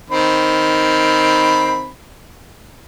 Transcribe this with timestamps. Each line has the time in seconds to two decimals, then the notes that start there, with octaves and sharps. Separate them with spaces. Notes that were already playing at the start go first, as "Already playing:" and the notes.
0.10 D#3 C4 B5